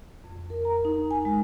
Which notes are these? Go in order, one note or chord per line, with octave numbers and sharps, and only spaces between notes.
F2
A#4
A#5
D#4
G#5
G#3